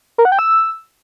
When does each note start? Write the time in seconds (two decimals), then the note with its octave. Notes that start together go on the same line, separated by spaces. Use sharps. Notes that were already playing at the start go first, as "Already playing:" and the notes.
0.18 A#4
0.25 F#5
0.32 G5
0.39 E6